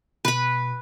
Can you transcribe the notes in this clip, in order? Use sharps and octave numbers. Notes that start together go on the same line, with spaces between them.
B2 B4 B5